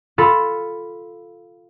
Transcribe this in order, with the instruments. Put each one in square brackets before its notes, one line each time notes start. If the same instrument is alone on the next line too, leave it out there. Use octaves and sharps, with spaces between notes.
[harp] F4 A4 B5